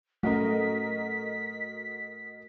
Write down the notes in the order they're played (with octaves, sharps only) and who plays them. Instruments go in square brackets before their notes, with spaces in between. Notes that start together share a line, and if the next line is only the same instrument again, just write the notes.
[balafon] F#3 C#4 [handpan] A3 [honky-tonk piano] F#4 A#4 D#5 [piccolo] B6